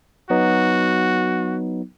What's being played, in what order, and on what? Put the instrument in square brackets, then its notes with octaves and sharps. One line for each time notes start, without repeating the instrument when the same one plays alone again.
[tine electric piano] F#3 B3 D#4 [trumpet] F#4